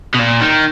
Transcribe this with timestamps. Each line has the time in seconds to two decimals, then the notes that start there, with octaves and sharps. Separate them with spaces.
0.15 B2
0.19 A#2
0.42 D#3